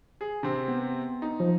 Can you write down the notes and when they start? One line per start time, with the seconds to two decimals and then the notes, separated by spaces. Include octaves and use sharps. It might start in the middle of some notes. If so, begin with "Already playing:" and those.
0.21 G#4
0.43 C3 C4
0.68 B3
1.22 D#4
1.40 F3